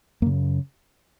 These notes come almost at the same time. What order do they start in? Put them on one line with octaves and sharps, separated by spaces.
F#2 A#3 C#3